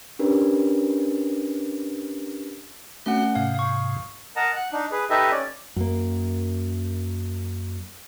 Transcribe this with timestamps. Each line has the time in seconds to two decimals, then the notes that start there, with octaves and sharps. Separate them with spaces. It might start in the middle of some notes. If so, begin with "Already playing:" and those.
0.19 C#4 D4 G4 A#4 B4
3.06 A3 C4 C#4 F#4 F#5
3.35 G#2 C3 F5
3.55 F5 C#6
4.36 A#4 D#5 F#5 A5 A#5
4.56 F#5 F#6
4.72 D4 D#4
4.92 G#4 B4
5.10 D#4 G4 A4 B4 D#5 E5
5.31 C#4 D5
5.76 F#2 A#3